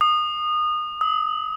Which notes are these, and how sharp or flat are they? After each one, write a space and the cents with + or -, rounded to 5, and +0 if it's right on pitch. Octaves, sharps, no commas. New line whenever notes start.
D#6 -25
D#6 +40